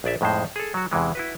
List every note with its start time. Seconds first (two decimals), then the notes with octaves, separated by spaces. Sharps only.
0.04 A#1 G#4 D5 E5
0.21 F2 A2 G#3 D#4 C5
0.56 G#4 A4
0.74 F#3 F#4
0.91 E2 C3 E3 G#3
1.15 E4 F#4 B4